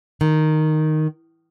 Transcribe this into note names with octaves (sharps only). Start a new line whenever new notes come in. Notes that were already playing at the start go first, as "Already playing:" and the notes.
D#3